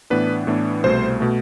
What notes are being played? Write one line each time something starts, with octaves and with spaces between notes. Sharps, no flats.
A2 E3 B3 D4 B4
A2 E3 B3 D4
C2 B2 A3 C5
B2 A3